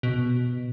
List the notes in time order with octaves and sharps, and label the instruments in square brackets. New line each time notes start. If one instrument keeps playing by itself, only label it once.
[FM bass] B2